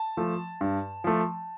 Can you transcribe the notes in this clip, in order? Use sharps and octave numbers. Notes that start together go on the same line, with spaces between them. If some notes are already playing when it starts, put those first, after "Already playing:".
Already playing: A5
F3 A3
G2
F3 A3